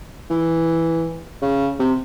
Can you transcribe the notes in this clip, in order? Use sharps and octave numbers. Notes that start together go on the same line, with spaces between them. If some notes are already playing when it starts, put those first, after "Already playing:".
E3
C#3
C3